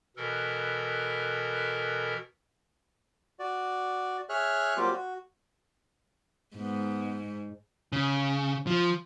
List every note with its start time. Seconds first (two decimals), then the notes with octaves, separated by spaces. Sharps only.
0.17 B2 E3 A4 A#4
3.39 F#4 D5
4.29 G#4 C#5 E5 F6 F#6
4.77 F#3 G3 A#3 C4 F4 G4
4.93 F#4
6.56 G#2 B3
7.93 C#3
8.67 F3